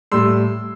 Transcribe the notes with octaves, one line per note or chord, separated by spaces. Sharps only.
A2 G3 C6 E6